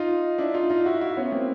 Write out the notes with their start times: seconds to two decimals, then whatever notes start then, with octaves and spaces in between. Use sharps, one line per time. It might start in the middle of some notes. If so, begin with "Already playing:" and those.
Already playing: D#4 F4
0.38 D4 E4
0.54 D#4 F4
0.69 D#4 F4
0.85 E4 F#4
1.01 E4 F#4
1.17 B3 C#4
1.32 A#3 C4